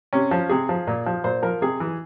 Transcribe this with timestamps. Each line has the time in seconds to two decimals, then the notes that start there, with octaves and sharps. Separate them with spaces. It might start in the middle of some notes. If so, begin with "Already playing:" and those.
0.13 C3 C#4
0.31 F3
0.49 C3 G#4
0.69 F3
0.87 A#2
1.06 F3
1.24 A#2 C5
1.43 F3 A#4
1.62 C3 G#4
1.80 E3